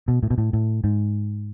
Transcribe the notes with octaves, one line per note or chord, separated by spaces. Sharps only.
B2
A2
B2
A2
A2
G#2